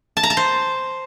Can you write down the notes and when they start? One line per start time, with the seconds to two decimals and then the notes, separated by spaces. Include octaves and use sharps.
0.17 A5
0.23 A#5
0.30 A5
0.37 C5